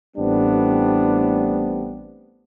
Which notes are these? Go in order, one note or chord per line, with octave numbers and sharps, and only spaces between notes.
A1 A2 G3 B3 C4 D4